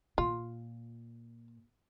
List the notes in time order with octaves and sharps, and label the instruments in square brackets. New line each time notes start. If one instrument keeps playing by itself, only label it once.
[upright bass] A#2 [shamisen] F4